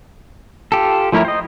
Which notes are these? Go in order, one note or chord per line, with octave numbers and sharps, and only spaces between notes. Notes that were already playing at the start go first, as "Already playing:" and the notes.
F4 G4 A4
F3 A3 E4 A#4 C#5
C5 D#5